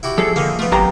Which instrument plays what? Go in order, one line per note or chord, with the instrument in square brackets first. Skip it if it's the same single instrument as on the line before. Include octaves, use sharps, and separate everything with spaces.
[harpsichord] E4 F#4 G4
[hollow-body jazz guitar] F3 G#4 [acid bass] A4
[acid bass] D3 [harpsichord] D#3 A#3
[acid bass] A3 [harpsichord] B3 F4
[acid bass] G#1 [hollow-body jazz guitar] F#2 G4 A#5